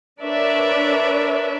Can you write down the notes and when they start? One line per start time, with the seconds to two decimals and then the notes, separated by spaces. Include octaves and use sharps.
0.21 D4 A#4 B4 C#5 D5 E5